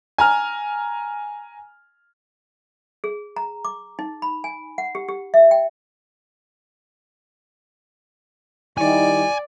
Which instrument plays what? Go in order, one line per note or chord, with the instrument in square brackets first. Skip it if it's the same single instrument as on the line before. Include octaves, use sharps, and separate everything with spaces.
[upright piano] G#5 A#5 F6
[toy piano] G#4
A#5
D6
D#4
B5
G#5
F#5
G4
G4
E5
G5
[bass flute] D#3 [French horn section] G3 E4 [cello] D5 [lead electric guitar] G#5